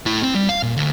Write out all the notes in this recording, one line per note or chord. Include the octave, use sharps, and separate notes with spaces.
A2 E4
C4
G3
F5
A#2
D2